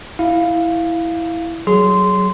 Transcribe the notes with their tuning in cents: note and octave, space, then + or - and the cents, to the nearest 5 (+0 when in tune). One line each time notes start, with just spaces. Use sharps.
E4 +0 F5 +0
F#3 +20 G#4 +15 C6 -15